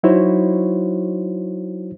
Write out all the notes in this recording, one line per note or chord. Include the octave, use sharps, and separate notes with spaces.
F#3 D#4 E4 F#4 C5 C#5